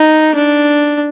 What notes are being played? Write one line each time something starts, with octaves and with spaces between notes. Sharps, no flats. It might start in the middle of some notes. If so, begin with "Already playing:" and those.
Already playing: D#4
D4